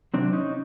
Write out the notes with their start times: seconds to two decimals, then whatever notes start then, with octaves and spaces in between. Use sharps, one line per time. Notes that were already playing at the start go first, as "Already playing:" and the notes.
0.14 C3 D#3 F#3 C4 D4
0.33 C#4 D#4